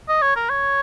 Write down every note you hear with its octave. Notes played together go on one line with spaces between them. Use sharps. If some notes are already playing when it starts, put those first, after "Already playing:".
D#5
C#5
A#4
C#5